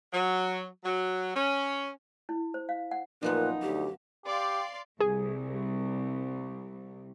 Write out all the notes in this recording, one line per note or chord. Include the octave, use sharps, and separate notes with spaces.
F#3
F#3
C#4
E4
C5
F5
F#5
F#2 A#2 F3 B3 D#4 B4
D2 G4
G4 D5 F5 C6
C2 G#4